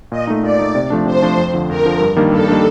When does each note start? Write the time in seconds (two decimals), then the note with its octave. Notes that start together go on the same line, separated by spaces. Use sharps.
0.11 A#2 D#5
0.27 A3 D#4
0.43 A#2 D5
0.59 A3 D#4
0.75 C3
0.90 F3 A3 D4
1.06 C3 C5
1.22 F3 A3 D4
1.37 F2
1.54 D3 F3
1.69 F2 A#4
1.85 D3 F3
2.00 G2
2.16 D#3 G3 A#3 D4
2.32 G2 A4
2.48 D#3 G3 A#3 D4